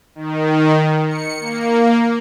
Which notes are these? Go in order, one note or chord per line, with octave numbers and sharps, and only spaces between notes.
D#3
C#7
A#3